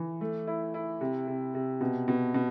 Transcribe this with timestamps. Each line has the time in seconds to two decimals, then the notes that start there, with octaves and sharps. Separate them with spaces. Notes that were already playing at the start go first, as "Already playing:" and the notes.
Already playing: E3
0.21 A3
0.47 E4
0.74 E4
1.01 C3
1.28 C3
1.54 C3
1.81 B2
2.08 B2
2.34 B2